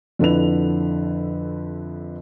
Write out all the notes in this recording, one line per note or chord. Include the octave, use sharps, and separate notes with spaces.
F2 D3 E4 B4 F7